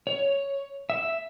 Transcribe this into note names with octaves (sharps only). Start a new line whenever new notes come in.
C#5
E5